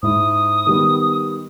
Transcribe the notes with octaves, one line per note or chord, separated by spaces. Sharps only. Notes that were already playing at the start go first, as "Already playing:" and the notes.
G#2 E4 D#6
D#3 G3 B3